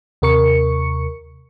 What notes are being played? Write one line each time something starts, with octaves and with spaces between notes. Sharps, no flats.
D#2 C3 A#4 C#6 C#7